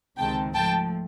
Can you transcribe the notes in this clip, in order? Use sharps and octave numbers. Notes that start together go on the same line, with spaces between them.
C#2 C3 D#3 G#3 C4 G5 A5
G#2 F3 A3 G5 A5